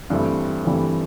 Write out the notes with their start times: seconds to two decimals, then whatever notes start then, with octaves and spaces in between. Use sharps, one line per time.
0.10 G2 E3 A3 C4
0.65 G2 E3 A3 C4